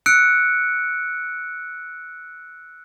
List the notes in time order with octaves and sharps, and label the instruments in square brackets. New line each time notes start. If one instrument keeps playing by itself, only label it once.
[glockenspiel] E6 F#6 C#7 D7